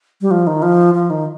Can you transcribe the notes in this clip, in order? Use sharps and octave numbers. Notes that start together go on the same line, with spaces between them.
G3
F3
D#3
F3
F3
D#3